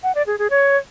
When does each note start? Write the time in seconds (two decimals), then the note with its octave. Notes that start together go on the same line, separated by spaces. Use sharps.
0.03 F#5
0.15 D5
0.27 G#4
0.38 G#4
0.50 C#5